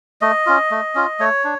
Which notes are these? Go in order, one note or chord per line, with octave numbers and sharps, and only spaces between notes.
A3 D#5
C#4 F4
A3
C#4 F4
A3 C#5
D4